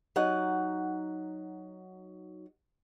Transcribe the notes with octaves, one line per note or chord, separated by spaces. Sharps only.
F#3 D#4 F#5